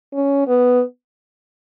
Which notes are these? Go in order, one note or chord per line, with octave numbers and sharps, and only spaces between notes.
C#4
B3